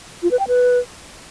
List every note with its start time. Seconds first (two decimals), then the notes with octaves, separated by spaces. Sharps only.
0.23 F4
0.31 B4
0.39 G5
0.48 B4